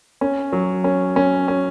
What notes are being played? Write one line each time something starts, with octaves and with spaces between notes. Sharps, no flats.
C#4
F#3
C#4
C#4
C#4